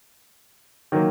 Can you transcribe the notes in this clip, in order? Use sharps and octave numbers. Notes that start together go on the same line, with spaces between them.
D#3 F#3 A#3